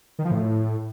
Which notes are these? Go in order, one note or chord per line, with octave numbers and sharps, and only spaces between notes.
D#3
F3
A2